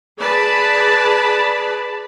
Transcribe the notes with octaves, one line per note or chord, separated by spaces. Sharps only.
G#4 B4 D5 A5 B5